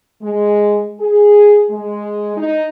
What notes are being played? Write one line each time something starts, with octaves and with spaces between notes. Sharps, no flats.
G#3
G#4
G#3
D#4